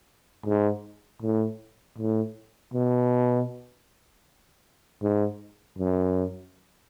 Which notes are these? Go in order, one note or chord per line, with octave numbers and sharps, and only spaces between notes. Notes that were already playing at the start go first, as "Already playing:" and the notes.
G#2
A2
A2
B2
G#2
F#2